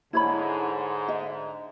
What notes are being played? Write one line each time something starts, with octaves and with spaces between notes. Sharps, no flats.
G#2 D3 E4 C#5 B5
D#5 E5